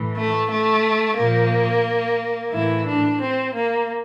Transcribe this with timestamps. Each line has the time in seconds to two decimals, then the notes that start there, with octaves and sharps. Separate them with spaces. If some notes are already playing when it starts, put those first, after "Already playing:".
Already playing: A2 E3
0.16 A3
0.50 A3
1.17 A#2 F3 A#3
2.52 A2 E3 E4
2.86 D4
3.20 C4
3.54 A#3